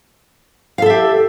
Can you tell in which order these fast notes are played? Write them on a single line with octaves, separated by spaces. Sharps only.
F5 A4 E5 G4